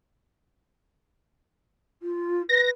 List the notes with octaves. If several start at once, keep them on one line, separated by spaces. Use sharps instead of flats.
F4
B4 A#6